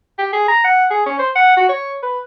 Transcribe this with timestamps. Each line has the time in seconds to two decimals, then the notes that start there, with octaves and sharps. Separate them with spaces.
0.19 G4
0.33 G#4
0.48 A#5
0.64 F#5
0.91 G#4
1.06 C#4
1.19 C5
1.36 F#5
1.57 F#4
1.69 C#5
2.03 B4